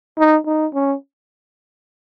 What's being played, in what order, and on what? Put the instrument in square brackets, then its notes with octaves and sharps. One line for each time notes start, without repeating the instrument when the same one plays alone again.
[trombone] D#4
D#4
C#4